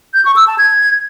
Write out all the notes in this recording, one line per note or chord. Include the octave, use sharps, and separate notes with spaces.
G6
C#6
E6
A5
G#6